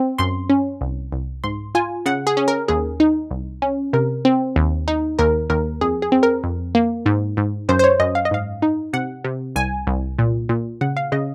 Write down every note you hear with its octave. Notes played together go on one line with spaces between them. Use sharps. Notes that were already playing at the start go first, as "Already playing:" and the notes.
Already playing: C4
F#2 C6
C#4
C2
C2
G#2 C6
F4 G#5
C#3 F#5
G#4
C#4
A#4
D#2 G#4
D#4
C2
C#4
C3 A#4
C4
D#2
D#4
D#2 A#4
D#2 A#4
F2 G#4
G#4
C4
A#4
F2
A#3
G#2
G#2
F#2 C5
C5
C#5
F#2 D#5
F5
D#5
G#2 F5
D#4
C3 F#5
C3
C2 G#5
C2
A#2
A#2
C#3 F#5
F5
C#3 D#5